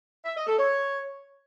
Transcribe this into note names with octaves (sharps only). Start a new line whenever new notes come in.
E5
D#5
A4
C#5